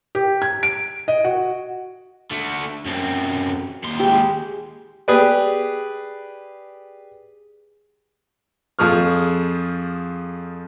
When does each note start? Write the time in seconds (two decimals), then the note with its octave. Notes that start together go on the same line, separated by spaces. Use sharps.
0.15 G4
0.42 G#6
0.63 D7
1.08 D#5
1.25 F#4
2.31 D3 A3
2.86 F#2 C4
3.83 D#2 C6
4.00 G#3 G4
5.08 G4 G#4 B4 D5
8.79 F2 F3 G#4 C#6 F6